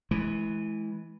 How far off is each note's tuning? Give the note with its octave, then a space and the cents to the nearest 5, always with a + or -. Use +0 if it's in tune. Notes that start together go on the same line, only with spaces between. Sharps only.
E3 -5 G#3 +35